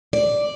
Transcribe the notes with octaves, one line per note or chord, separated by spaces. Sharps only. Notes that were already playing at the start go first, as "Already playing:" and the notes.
D5